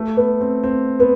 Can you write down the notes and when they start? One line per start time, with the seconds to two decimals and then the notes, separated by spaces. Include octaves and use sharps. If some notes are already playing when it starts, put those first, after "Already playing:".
Already playing: A3
0.17 B3
0.41 C4
0.64 C4
1.00 B3